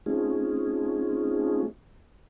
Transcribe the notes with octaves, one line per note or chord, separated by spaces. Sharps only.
A3 C4 C#4 D#4 F4 G#4